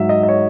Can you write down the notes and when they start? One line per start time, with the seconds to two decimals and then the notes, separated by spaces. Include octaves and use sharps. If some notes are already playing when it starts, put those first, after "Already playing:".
Already playing: G#2 F#3 E5
0.09 D#5
0.23 D#5
0.29 C#5